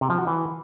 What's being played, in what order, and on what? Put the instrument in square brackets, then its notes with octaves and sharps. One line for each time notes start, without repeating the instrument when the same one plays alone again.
[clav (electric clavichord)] C3
F3
F#4
E3